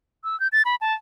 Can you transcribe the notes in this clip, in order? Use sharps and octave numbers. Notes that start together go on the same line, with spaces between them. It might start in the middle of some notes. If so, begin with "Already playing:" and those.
E6
G6
A6
B5
A5